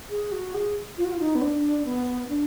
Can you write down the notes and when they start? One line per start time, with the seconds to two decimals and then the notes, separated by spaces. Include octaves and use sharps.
0.10 G#4
0.32 F#4
0.54 G#4
0.98 F4
1.05 F#4
1.12 F4
1.19 D#4
1.35 B3
1.42 D4
1.85 B3
2.29 D4